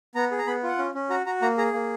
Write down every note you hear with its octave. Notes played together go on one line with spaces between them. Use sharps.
B3 A#5
G#4
A#5
B3 B5
F4 F#5
C#4
C#4
F#4 A#5
F#4 A#5
A#3 A#5
G#4 A#5
A#3